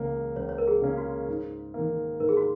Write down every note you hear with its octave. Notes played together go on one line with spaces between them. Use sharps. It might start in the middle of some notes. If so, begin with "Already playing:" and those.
Already playing: C#2 C#3 A#3 C#4
C#2 C#5
C#5
A#4
G#4
C#3 A#3 C#4
F#4
G#2
D#3 A#3
G#2 A#4
G#4
F#4